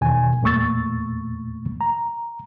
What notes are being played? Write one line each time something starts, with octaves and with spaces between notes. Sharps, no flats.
E2 B2 D#3 G#5
E2 A#2 A3 C#6 E6 A6
A#5